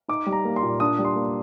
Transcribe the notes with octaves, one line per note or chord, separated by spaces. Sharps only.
D#4 D6
G3
A#5
A#3
C6
A#2
D4 D#6
G3
C6
A#3